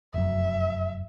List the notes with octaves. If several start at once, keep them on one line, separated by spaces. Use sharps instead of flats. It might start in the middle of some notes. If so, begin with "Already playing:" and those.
F1 F#2 E5